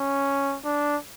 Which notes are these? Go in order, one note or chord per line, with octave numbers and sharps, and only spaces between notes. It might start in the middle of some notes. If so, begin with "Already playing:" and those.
Already playing: C#4
D4